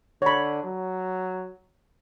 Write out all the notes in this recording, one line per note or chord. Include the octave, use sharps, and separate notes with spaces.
D3 C#5 B5
F#3